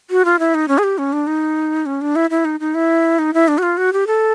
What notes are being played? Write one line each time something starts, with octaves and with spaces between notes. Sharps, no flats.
F#4
F4
E4
D#4
C#4
G#4
G4
C#4
D4
D#4
C#4
D4
E4
E4
D#4
D#4
E4
D#4
E4
D4
F#4
F4
F#4
G4
A4